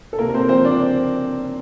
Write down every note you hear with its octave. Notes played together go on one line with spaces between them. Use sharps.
A4
C3 A#3 A#4
A#4
C4 C5
F3 C4 C5
D4 D5